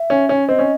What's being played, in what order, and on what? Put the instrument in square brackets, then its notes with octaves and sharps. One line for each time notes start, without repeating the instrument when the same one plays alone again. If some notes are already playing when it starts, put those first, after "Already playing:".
Already playing: [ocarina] E5
[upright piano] C#4
C#4
[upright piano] C4 [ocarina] D#5
[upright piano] C#4